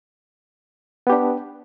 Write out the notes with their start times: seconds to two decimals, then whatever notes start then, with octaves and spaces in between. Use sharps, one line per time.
1.07 B3
1.10 G4
1.12 D4